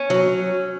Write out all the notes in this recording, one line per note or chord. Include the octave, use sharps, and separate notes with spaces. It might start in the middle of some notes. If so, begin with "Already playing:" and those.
Already playing: C#4
F#3